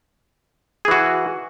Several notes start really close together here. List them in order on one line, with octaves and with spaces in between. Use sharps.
G#4 E3 F#4